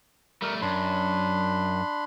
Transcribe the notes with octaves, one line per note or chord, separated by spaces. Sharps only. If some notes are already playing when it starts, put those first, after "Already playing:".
G3 A3 A#4
F#2 D4 B5 C6